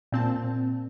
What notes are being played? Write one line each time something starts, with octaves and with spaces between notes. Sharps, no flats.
A#2 C4 A5